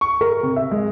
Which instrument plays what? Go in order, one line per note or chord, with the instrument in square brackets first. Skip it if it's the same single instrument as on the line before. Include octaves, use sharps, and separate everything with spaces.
[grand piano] C#6
A#4
C3
E5
G#3